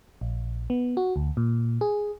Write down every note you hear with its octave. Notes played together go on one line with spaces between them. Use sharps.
A#1
B3
F#4
D2
A#2
G#4